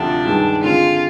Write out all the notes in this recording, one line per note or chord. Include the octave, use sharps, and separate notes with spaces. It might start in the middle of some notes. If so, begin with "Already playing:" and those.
Already playing: D2 C3 F3 D4
G2 D#3 G#3
D3 G#3 C4 F4